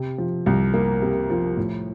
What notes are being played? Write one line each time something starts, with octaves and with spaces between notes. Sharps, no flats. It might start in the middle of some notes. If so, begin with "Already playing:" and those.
Already playing: C3
F3
C2
A#3
C3
F3
A2